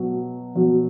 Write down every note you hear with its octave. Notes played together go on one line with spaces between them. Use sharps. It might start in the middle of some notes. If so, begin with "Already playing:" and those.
Already playing: B2 F#3
B2 F#3